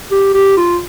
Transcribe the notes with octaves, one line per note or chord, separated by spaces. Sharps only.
G4
G4
F4